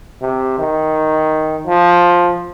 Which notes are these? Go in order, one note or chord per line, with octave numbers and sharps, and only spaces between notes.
C3
D#3
F3